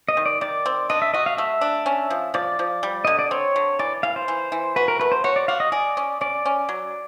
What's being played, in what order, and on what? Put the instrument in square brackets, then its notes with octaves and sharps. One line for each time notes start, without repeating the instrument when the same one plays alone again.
[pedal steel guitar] D#5
[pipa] D#3
[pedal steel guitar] D5
[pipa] D#3 [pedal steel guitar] D5
[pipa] C4
[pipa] D4 [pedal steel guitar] D#5
[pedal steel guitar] E5
[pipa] F#4 [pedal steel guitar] D#5
[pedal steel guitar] F5
[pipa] A3 [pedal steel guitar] E5
[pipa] D4
C#4
F3
[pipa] F3 [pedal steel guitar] D5
[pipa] F3
G3
[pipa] D3 [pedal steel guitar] D#5
[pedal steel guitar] D5
[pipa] C4 [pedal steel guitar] C#5
[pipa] D3
[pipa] E3 [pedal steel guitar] D5
[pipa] E3 [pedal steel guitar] F5
[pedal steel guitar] C5
[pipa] E3
E3
[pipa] F#4 [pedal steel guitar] B4
[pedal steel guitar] A#4
[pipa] A3 [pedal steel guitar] B4
[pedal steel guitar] C5
[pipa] F#4 [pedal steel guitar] C#5
[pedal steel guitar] D5
[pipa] F#4 [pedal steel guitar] F5
[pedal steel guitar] D#5
[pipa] G#4 [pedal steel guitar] D5
[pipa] C#4
[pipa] C#4 [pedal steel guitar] D5
[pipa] C#4
F#3